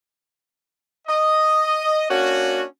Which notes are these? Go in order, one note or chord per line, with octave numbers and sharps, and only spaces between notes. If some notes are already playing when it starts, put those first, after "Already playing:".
D#5
A#3 C#4 D4 F#4